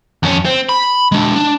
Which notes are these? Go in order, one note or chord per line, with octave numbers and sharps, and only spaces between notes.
F2 C#4
C4
B5
G#3 D4
D4